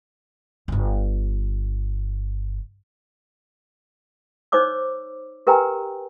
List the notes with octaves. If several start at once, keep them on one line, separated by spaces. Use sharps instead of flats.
D1 G1
D#4 C5 C#5 D6 E6
G4 A#4 B4 G5 G#5 A#5